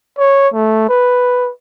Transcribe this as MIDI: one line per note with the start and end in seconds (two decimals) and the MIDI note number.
0.18 0.49 73
0.54 0.88 57
0.89 1.50 71